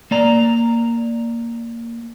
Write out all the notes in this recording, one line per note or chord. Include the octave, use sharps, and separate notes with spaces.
A#3 D5 A#5